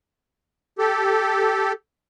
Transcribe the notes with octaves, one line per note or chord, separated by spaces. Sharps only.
G4 A4